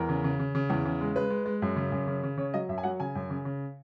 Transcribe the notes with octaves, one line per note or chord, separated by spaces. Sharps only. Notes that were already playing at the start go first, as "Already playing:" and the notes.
Already playing: E2 A#4
C#3
C#3
C#3
C#3
E2
C#3
G#3
G#3 B4
G#3
G#3
F#2
C#3
F#2
C#3
C#3
C#3 C#5
F#3 D#5
F#2 E5
G#5
F#3 F#5
C#3 G#5
F#2
C#3
C#3